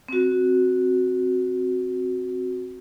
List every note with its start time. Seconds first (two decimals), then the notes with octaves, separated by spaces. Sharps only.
0.08 C4 F#4